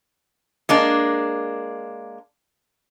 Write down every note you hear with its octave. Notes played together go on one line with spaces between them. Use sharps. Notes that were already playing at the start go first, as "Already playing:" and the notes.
G#3 A#3 D4